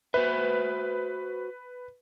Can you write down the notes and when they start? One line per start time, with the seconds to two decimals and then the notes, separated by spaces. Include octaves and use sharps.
0.14 F#4 B4 C5 E5